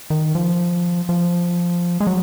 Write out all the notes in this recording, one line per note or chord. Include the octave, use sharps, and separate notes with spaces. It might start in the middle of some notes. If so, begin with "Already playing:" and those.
D#3
F3
F3
G#3
F#3